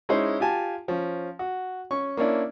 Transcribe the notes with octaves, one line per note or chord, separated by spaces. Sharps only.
G#3 C#4 D#4 E4 C5
F4 G4 G#5 A5
F3 C#4
F#4
C#4 C#6
A#3 C#4 D4 E4